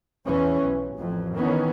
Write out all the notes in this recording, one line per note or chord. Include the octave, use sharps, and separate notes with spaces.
E2 E3 C#4
B1
A1 F2
D#3 E3 B3 C#4